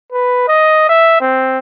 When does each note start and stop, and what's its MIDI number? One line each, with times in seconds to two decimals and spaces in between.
0.12 0.47 71
0.48 0.87 75
0.89 1.16 76
1.21 1.58 60